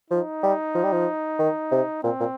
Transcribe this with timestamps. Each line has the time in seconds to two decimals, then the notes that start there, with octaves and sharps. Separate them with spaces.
0.11 F3 D#4
0.43 G3
0.75 F3
0.84 G3
0.92 F3
1.39 D#3
1.71 C3
2.03 A#2 C4
2.20 A#2